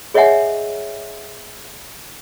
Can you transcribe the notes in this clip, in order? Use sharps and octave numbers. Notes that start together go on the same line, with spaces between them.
G#4 C#5 D#5 E5 F#5 G#5